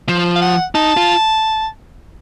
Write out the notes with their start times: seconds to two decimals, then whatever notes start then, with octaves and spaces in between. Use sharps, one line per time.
0.09 F3
0.36 F5
0.42 F#5
0.75 D#4 A5
0.97 F4